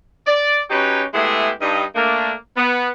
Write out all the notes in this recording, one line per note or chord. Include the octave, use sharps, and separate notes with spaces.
D5
F#3 C#4 D#4 G4 B4 C#5
G#3 A3 B3 E4 G4 G#4
G2 D#4
A3 A#3 D4
B3